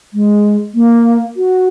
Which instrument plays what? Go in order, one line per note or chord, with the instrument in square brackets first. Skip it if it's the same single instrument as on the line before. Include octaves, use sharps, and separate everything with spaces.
[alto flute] G#3
A#3
F#4